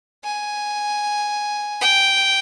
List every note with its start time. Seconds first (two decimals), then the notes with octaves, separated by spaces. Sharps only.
0.24 G#5
1.81 G5